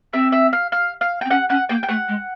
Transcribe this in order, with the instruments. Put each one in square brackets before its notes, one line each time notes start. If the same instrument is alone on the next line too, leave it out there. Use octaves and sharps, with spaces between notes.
[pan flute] C4 [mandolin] E5
[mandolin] E5
F5
F5
F5
G5
[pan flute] C4
[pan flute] C#4 [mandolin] F#5
[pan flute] C#4 [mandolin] F#5
[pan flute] A#3 [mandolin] G5
[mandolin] G5
[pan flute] A3 [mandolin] F#5
[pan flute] G#3